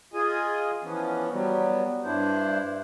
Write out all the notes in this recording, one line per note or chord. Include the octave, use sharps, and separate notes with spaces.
F4 G#4 D#5 G#5
E3 F3 B3 C#4
F#3 G3 B3
G2 D4 E4 C5